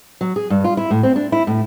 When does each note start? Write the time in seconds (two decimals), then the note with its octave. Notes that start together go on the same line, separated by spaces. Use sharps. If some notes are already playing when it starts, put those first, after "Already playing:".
0.21 F#3
0.36 G#4
0.50 G2
0.64 F4
0.77 E4
0.91 A2
1.03 C4
1.16 D4
1.32 E4
1.47 A2